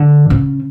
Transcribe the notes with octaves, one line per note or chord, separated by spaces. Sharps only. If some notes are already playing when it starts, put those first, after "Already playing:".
Already playing: D3
C#3